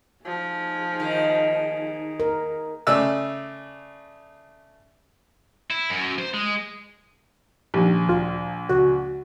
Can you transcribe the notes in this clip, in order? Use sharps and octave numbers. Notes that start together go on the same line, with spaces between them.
F3 D#4 G#4
D#3
A#4
C#3 A3 D5 E6
E4
F#2
C5
G#3
A#1 D#3 G3
D2 F4
C#2 F#4